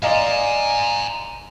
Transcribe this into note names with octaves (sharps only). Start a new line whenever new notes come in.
D5 D#5 F5 G#5 A#5